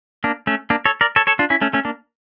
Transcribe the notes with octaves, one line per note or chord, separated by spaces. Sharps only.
A#3 D4
A3 C#4
A#3 D4
A4 C#5
A#4 D5
A4 C#5
A4 C#5
D4 F4
C#4 E4
A3 C#4
A3 C#4
A#3 D4